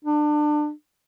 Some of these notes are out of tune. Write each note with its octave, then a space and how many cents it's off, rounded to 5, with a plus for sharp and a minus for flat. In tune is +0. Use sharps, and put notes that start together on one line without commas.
D4 +25